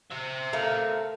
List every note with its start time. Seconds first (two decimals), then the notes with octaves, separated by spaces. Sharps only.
0.11 C5 E5
0.53 A3 A#4 F5